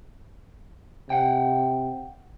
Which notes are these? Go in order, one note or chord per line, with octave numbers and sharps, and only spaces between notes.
C3 F#5 G5